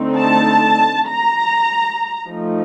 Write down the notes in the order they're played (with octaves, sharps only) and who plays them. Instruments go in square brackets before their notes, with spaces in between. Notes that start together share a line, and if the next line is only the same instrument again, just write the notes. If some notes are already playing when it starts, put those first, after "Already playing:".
Already playing: [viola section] D3 A3 C4 D#4
A5
A#5
F3 A3 D#4